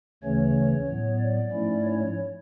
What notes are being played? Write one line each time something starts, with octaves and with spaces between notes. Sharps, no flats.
D2 C#3 E3 A3 C#4 C#5
A2 F#3 B3
D5
G#2 F3 A3 C#4 E4
C#5